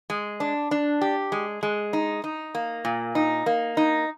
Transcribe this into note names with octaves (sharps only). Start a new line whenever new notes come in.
G#3
D4
D4
G4
G#3
G#3
D#4
D#4
A#3
A#2
D#4
A#3
D#4